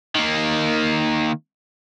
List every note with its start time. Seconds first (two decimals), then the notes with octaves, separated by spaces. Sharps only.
0.15 D#3 A#3